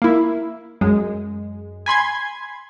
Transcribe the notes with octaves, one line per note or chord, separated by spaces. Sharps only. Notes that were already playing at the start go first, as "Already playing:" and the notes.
A#3 E4
F#2 G#3
G#5 B5 C6 G#6